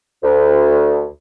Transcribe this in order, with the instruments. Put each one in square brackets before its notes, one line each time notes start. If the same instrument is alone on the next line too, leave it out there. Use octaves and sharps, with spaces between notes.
[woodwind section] D2